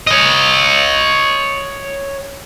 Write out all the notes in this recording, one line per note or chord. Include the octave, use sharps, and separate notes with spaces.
C#5 D#5